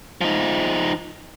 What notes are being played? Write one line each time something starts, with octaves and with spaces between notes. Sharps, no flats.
F3 D#4